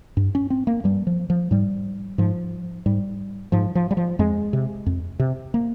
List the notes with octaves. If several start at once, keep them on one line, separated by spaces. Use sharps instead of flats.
G2
C#4
C4
A#3
G2 G3
F3
F3
G#2 G3
G#2 F3
G#2 G3
G#2 F3
F3
G3
F3
F2 G#3
C3
F2
C3
A#3